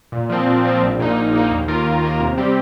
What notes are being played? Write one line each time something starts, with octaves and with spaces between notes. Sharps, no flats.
A#2
F3 C4
A#2
F3 C4
A#1
A#2 A#3 D#4
A#1
A#2 A#3 D#4
D#2
D#3 A#3 F4 A#4
D#2
D#3 A#3 F4 A#4
C3
G3 C4 G4